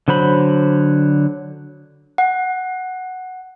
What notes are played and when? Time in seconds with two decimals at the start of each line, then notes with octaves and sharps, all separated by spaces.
0.08 D3 F#3 C5 B5
2.18 F#5